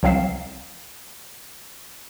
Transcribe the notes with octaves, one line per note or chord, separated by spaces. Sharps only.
C2 F#3 C4 F5 C7 E7